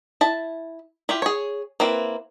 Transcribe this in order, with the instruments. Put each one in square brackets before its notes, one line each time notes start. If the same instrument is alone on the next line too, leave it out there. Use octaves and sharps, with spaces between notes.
[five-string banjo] E4 A5
E4 F4 G4
G#4 C#5
A#3 C4 E4 B4